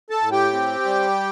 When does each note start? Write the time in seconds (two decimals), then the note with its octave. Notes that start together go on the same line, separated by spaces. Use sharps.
0.10 A4 A5
0.21 A2
0.32 G4 G5
0.53 C4
0.85 G3